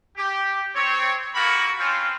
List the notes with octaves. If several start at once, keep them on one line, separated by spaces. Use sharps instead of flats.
G4
C4 C#5
A#3 F4 F#4 A4 A#4 B5
C4 C#4 F4 C5 F5